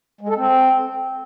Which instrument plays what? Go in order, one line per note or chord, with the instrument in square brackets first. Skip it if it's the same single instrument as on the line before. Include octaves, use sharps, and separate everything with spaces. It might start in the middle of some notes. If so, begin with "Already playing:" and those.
[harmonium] G#3
A4
C4